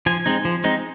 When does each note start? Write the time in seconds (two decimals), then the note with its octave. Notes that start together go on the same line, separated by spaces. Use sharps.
0.06 F3 G#5
0.26 G#3 C4 D#4
0.45 F3
0.64 G#3 C4 D#4